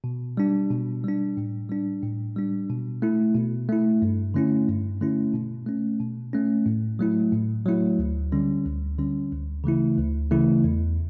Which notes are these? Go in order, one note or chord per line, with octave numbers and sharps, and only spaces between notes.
B2
G3 D4
B2
G3 D4
A2
G3 D4
A2
G3 D4
B2
A3 E4
B2
A3 E4
G2
D3 A3 C#4 E4
G2
D3 A3 C#4 E4
B2
A3 C#4
B2
A3 C#4
A2
F#3 A3 E4
A2
F#3 A3 E4
D2
D3 G3 C#4
D2
D3 G3 C#4
D2
C#3 E3 A3 E4
D2
C#3 E3 A3 E4
E2